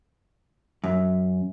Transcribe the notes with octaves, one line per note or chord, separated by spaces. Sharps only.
F#2